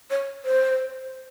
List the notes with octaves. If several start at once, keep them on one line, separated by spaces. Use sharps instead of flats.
C#5
C5